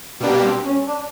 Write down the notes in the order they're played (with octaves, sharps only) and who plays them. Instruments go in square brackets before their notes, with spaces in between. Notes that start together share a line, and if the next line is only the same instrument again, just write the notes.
[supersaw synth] B2 G3 A#3 D4 G4 [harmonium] B3
[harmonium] C4
C#4
D4